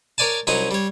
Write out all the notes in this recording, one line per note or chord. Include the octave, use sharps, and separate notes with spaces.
A#4 C#5 D5 G#5 A5
C2 F#3 C#4 D#4 D#5 F#5
G3 C#5